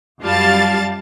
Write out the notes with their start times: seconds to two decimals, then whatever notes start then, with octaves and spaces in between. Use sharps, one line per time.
0.22 F#2 G3 F4 F5 A5 A6